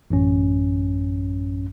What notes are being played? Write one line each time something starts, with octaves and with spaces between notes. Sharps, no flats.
A1 F#2 C#4